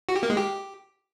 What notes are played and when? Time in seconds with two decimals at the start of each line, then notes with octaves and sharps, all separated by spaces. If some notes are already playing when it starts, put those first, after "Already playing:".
0.09 F#4
0.16 G4
0.23 A#3
0.30 G#3
0.37 G4